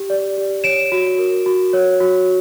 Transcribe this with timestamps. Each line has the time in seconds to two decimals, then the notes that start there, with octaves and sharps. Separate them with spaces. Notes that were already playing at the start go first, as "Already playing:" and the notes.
Already playing: G4
0.10 D5
0.38 G4
0.64 C#5 D7 E7
0.92 F#4
1.18 A#4
1.46 F#4
1.73 C#5
2.00 F#4